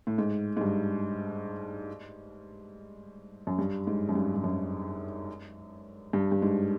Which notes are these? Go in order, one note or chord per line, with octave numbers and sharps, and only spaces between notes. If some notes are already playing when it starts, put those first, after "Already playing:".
A2
G#2
G#2
G2
F#2
G2
G#2
F#2
G2
G2
F#2
G2
G2
G#2